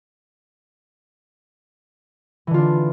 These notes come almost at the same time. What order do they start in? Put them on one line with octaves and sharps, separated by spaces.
E3 D3 F4 D4